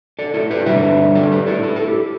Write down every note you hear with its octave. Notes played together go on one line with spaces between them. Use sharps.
A4 D5
E4 A4
G4 B4
D3 G3 D4 B4 E5
A4 D5
G4 B4
E4 A4
E4 A4
A4
G4